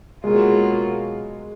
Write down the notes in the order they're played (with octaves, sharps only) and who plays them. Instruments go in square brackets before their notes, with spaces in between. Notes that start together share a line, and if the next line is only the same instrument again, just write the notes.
[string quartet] B2 F#3 A#3 F4 [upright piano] G#3